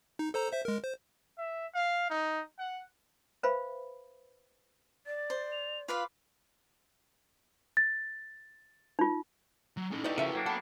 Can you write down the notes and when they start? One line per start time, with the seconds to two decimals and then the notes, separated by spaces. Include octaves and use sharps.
0.19 D#4
0.34 A4 C5 A#5
0.52 C5 E5
0.65 G#3 A#4
0.84 C5
1.38 E5
1.74 F5
2.10 D#4
2.59 F#5
3.43 B4 C5 E5 F5 B5
5.06 D5 A6
5.30 C5
5.52 F7
5.88 F4 B4 F5 D6
7.77 A6
8.99 D#4 F4
9.77 F#3
9.92 C#4 D#4 E4 A4
10.04 D#4 E4 F#4 A4 B4 D5 G5
10.18 C#3 F3 A#4 E5
10.35 F#3 A#3 D4 G5
10.46 A4 B4 F#5 B5